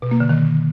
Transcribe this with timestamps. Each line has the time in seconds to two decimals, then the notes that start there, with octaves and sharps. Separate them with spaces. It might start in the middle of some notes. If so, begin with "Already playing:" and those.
0.02 B2
0.11 A#3
0.20 D3
0.29 D#3